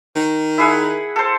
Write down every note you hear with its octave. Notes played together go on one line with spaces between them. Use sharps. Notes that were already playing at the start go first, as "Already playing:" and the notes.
D#3
E4 G#4 F#5
A4 C5